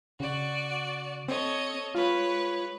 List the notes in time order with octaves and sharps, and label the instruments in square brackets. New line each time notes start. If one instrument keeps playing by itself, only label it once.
[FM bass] C#3 [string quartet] F#4 D5
[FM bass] C4 [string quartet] A4 C#5 D#5
[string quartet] G#3 B4 C#5 [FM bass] F4